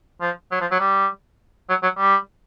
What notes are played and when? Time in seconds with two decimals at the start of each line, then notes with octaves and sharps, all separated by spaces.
0.21 F3
0.51 F#3
0.61 F3
0.71 F#3
0.80 G3
1.69 F#3
1.83 F#3
1.98 G3